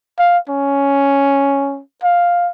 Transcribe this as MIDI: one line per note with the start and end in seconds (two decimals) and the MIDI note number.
0.19 0.38 77
0.49 1.81 61
2.03 2.51 77